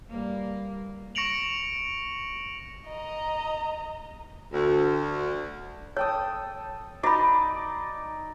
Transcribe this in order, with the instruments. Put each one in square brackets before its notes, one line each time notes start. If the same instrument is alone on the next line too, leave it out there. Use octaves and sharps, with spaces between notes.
[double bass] G2 G3 [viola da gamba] A#3
[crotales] C#6 A#6 C#7 D7 F7 F#7
[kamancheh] D#5 A#5
[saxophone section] D2
[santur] A4 G5 D#6 [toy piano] C#5
[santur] D#4 D5 D#5 [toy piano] F#4 B5